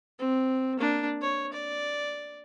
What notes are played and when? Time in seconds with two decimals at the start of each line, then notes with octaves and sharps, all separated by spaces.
0.19 C4
0.80 A#3 D4
1.21 C#5
1.53 D5